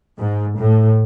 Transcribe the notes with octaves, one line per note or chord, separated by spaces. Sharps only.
G#2
A2